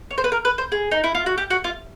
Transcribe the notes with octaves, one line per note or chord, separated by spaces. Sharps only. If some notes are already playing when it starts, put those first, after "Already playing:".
C#5
C5
B4
A#4
B4
C5
G#4
D#4
E4
F4
F#4
G4
F#4
F4